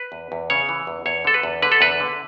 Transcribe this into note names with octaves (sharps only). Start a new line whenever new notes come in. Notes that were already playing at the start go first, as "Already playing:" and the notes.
Already playing: B4
E2
E2
C#3 C#5
E3
E2
E2 C#5
D3 A4
B4
E2
D3 B4
A4
E2 B4
D3